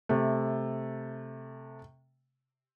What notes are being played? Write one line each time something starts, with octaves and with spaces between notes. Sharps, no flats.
C3 A3